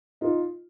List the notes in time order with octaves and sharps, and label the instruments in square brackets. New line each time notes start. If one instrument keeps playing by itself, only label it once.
[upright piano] D#4 F4